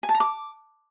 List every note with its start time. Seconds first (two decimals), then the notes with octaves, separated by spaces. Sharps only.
0.03 G#5
0.09 A5
0.14 A#5
0.20 D6